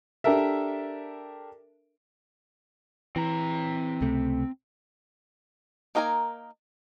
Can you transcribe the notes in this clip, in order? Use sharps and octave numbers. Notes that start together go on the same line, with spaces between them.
D4 G4 A4 A#4 E5
E3 C4 A#5
C#2 C3 A3
A#3 D#4 A#4 D5 G#5